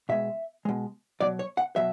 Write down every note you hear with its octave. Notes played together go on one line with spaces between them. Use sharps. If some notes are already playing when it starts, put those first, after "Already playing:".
B2 G#3 E5
B2 G#3
B2 F#3 D5
C#5
F#5
B2 F#3 E5